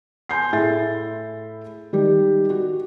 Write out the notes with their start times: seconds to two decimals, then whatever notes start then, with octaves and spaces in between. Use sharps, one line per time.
0.29 G#5 C6 G6 C7
0.53 A2 E4 G#4 E5 A6
1.93 D#3 G3 G4
2.50 F#4